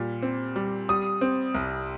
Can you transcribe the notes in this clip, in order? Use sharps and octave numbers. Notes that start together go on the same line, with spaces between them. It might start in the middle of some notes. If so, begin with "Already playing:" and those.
Already playing: A#2 G3
C4
G3
G3 D#6
C4
C2